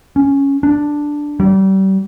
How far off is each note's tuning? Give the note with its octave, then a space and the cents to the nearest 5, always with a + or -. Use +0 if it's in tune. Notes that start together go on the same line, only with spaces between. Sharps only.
C#4 +0
D4 +0
G3 -35